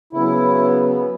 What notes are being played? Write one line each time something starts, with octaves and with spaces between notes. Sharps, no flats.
C#3 F#3 B3 E4